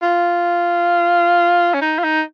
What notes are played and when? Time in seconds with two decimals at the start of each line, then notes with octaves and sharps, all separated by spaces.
0.02 F4
1.74 C#4
1.81 D#4
1.99 F4
2.04 D#4